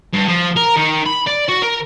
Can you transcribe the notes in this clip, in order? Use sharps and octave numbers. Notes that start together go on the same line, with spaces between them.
G2
F3
A#4
D#3
B5
D5
F#4
A#4